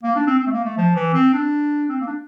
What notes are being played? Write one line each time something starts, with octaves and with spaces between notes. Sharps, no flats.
A#3
D4
C4
C4
A3
A#3
A3
F3
E3
C4
D4
C4
A#3
D4